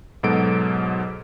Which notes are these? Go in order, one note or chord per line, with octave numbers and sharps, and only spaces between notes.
G#2 B2 F#3 A4 D7